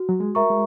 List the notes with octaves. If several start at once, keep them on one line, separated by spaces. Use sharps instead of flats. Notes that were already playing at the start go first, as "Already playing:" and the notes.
Already playing: F#4
F#3
G#3
A#4 E5 A#5 C#6
G#3